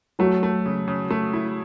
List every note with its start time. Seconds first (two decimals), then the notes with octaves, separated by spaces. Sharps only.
0.19 F#3 A3 F#4
0.43 A3
0.66 C#3
0.88 C#3
1.11 A3
1.33 E4